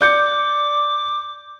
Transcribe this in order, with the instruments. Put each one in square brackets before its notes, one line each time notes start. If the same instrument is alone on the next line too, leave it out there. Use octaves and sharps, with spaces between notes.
[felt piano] D5 G6 C#7 [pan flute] D6